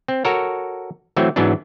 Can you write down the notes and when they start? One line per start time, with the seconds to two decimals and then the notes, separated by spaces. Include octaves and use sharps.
0.08 C4
0.25 F#4 A4 A#4 C#5
1.17 E3 F#3 A3 C4
1.36 G#2 E3 F#3 B3 C#4 D4